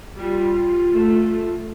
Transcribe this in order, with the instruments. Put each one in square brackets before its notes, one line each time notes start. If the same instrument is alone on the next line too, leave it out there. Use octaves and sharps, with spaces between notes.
[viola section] G3 [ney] F4
[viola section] A3